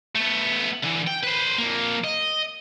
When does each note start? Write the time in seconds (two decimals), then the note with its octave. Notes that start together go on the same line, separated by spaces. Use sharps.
0.15 A3 B3
0.83 D3 E3
1.07 G5
1.23 B4 C5
1.58 F2 A#3
2.04 D#5